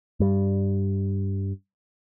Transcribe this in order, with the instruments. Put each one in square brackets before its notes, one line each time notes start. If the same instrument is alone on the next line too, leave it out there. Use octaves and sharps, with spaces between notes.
[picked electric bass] G2 G3